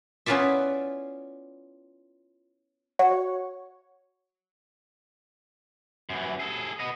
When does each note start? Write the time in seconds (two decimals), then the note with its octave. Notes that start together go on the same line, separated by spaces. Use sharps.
0.26 B3 C#4 E4 F4 D5 E5
2.99 F#4 C#5
6.09 F#2 E3
6.40 G#4 A4
6.80 B3 D#5